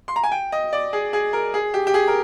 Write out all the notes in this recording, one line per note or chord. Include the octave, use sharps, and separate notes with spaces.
C6
A#5
G#5
G5
D#5
D5
G#4
G#4
A#4
G#4
G4
G4
G#4
A#4